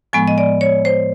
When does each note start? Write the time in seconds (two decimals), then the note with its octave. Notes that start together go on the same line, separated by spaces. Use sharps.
0.13 A2 F3 G#3 B3 G#5
0.28 D#5
0.38 D5
0.61 C#5
0.85 C5